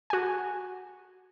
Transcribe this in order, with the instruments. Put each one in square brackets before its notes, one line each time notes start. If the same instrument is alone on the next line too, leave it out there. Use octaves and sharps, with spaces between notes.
[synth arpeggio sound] F#4 G#5